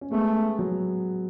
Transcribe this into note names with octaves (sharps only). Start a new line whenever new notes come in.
C#4
G#3 A3 B3
F#3